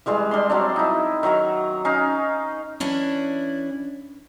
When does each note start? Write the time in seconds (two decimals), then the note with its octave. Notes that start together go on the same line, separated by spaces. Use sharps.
0.06 E3 G3 G#3 C6
0.31 G3 D4 C6
0.50 F#3 C4 D4
0.76 D#4 E4
1.23 D#3 F#3 E5 A#5
1.85 C#4 D#4 F5 G#5
2.80 E3 C#4 D4 E4